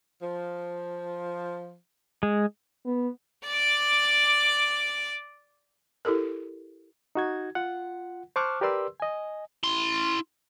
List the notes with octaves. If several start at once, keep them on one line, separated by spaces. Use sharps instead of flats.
F3
G#3
B3
D5 D6
E4 G4 A4 A#4
D#4 F#4 G#6
F4 F#5
C5 A5 C#6 D6 F6 F#6
G4 A#4 B4 D5 C6 E6
D#5 G#5
E4 C6